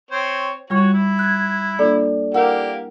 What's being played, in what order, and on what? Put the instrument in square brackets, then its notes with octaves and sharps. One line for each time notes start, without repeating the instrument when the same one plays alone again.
[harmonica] C4 C5 C#5
[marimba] G3 F4 C#6 [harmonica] F#4 C#5
[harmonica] E4
[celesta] F#6 G#6
[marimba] A#3 D4 F4 [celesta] A4 D5
[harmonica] A#3 G4 F5 [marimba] E4 A#4 F#5